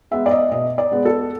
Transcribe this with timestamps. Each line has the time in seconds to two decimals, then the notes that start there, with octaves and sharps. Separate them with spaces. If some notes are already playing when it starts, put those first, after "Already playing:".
0.11 G#3 B3 E5
0.26 D5
0.31 D#5
0.51 B2 D#5
0.78 D5
0.92 G#3 B3
1.05 A4